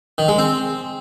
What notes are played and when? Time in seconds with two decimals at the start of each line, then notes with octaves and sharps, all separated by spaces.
0.18 D#3
0.28 G#3
0.38 C4